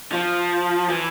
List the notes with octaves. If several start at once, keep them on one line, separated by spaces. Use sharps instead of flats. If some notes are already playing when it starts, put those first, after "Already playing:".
F3
E3